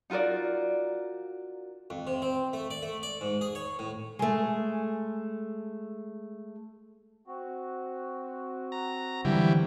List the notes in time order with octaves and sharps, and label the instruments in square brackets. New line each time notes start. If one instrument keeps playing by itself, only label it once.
[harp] D#4 F4 F#4 A#4 D5
[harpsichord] F2
C3
C4
A3
D5
A3
D5
G#2
G#4
C#5
A2
[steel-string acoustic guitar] G#3 A3
[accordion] C4 F#4
[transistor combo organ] A#5
[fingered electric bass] D3 F#3 [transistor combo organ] E3 G3